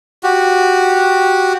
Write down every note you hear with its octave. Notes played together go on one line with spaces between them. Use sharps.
F#4 G4